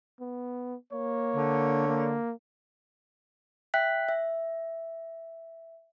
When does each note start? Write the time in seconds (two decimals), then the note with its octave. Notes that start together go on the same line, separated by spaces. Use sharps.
0.20 B3
0.93 A#3 C#5
1.35 D3
1.88 A#3
3.74 E5 G5 F#6 B6
4.09 E5